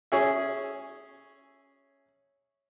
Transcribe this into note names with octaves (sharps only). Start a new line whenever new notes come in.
C#4 G#4 E5